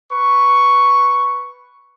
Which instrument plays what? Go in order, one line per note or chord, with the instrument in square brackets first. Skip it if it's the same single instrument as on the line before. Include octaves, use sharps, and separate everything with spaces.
[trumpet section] B4 C#6